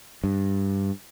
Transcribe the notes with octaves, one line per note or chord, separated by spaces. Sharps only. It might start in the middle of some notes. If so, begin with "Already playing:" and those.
G2